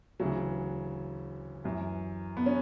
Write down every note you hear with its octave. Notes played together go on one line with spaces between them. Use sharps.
D2 C#3 E3 F#3
F#2 E3
B3
C#4